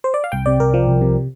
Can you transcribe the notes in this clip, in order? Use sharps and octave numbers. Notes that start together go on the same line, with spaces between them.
C5
D5
F5
C2 G5
C3 D5
C2 A#4
F3
C2
C3